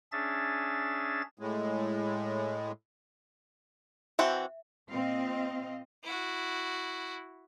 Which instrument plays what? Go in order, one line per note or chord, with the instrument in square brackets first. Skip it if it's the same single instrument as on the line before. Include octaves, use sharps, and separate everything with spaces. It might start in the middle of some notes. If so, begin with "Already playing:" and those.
[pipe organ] C#4 D4 G#4 E5 A6
[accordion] A2 G#3
[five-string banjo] E3 C4 F#4 [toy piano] E5
[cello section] A#2 C4 D#5 F5
[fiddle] E4 F#4